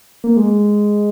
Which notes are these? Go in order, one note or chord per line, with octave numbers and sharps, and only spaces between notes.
A#3
G#3